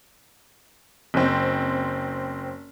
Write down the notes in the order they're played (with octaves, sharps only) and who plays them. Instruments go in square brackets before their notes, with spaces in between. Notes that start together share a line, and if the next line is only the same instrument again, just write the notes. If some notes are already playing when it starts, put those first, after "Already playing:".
[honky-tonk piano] F#1 C4